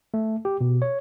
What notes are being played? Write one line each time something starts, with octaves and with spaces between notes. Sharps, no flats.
A3
G4
B2
C#5